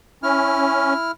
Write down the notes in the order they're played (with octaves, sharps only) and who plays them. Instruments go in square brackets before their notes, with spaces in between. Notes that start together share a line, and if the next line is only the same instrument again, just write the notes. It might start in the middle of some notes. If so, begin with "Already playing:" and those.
[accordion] C#4 [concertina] E4 F6